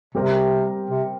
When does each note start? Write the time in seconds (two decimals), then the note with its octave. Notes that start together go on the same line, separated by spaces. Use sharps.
0.15 C3 G3 C4 G4 A#4
0.90 C3